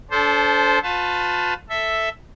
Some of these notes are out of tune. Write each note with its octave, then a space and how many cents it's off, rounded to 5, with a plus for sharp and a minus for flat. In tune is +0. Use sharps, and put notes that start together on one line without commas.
D4 -40 A4 -15 C5 +0
F4 +35 B4 +35 A5 +0
A4 +5 E5 +0